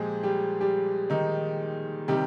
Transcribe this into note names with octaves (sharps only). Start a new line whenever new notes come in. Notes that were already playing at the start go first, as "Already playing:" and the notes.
Already playing: A#2 F3 G#3 G4 G#4
G3 G4
G3 G4
D#3 D#4
C3 D#3 G3 G4